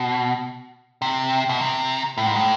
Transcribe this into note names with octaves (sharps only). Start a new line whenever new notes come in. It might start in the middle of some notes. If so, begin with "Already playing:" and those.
Already playing: B2
C3
B2
C3
A2
G#2
A2